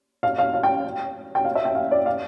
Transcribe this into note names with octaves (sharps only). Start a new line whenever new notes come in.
F5
F5
F5
G5
G5
F5
E5
G5
F5
D5
F5